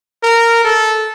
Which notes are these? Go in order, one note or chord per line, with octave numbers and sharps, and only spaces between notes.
A#4
A4